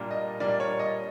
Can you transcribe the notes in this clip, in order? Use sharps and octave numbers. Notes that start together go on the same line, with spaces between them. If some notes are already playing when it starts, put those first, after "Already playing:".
Already playing: A#2 G3 A#3 D4
D#5
A#2 G3 A#3 D4 D5
C#5
D#5